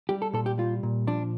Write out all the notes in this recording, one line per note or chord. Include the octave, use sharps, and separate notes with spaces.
G3 G4
A4
A#2 A4
G4
G3 F4
A#2
F3 D4